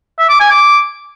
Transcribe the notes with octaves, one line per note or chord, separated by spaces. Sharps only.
E5
D6
G#5
D6